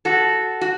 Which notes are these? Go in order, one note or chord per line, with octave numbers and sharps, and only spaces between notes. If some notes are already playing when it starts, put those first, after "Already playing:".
F#4 A4
F#4